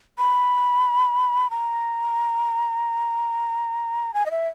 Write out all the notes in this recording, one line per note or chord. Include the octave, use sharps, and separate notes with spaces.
B5
A#5
G#5
D#5
E5